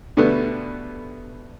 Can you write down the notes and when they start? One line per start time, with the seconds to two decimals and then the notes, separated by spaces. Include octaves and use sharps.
0.17 B2 D3 G3 A3 B3